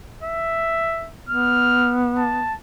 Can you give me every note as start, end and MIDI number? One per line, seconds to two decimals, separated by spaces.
0.23 1.10 76
1.29 2.49 59
1.29 1.94 89
2.18 2.54 81